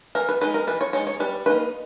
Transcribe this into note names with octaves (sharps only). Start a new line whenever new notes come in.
E3 A#4
B4
G#3 D#4 B4
A#4
E3 B4
C#5
G#3 D#4 C#5
C#5
G3 B4
A#3 D#4 B4